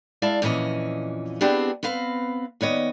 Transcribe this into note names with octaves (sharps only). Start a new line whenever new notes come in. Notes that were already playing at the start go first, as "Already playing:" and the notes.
G#3 E4 D5 E5 F5 A5
F2 A#2 E3 C#4 D#5
B3 C4 D4 E4 G4 G#4
B3 C4 B4 F5
D#2 B3 C#5 D#5